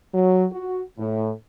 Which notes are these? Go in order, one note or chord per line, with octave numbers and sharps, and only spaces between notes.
F#3
F#4
A2